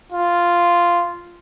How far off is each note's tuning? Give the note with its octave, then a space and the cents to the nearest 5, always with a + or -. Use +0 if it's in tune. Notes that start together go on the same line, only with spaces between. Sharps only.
F4 -5